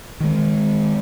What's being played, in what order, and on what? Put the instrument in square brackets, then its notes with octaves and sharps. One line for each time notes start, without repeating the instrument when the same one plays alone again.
[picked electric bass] D#3 G#3